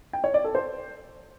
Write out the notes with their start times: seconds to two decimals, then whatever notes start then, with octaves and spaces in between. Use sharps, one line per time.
0.13 G5
0.24 C#5
0.34 D5
0.44 A4
0.55 C5